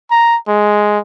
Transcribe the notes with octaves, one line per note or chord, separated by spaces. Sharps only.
A#5
G#3